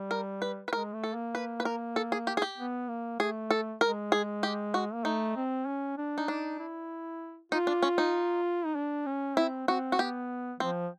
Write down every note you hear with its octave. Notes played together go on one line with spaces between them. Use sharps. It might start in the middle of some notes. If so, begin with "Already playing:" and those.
Already playing: G3
A#4
B4
B4
G#3 A#4
A3
A4
A#3
B4
B4
A#4
A4
G#4
G4
G#4
G4
B3
A#3
A3 G#4
A4
G#3 A#4
G#4
G4
F#4
A#3
A3 D#4
C4
C#4
D4
D#4
D4 D#4
E4
D#4 F4
D4
C#4
D#4
D#4
D4
C#4
C4 E4
C4 F#4
F#4
B3 G4
F3 C4